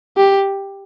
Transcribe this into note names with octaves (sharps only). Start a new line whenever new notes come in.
G4